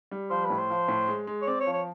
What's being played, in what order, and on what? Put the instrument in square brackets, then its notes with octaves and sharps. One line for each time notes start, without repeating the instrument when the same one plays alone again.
[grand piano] G3
[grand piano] F3 [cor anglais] C5
[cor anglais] B4
[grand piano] A2
[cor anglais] C5
[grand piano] F3
A2
G#3
G#3
[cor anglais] C#5
[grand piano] C4 [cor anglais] D5
[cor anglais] C#5
[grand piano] F3
[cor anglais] C#5